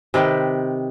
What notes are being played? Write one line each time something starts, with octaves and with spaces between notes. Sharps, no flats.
C3 D#3 B4 G5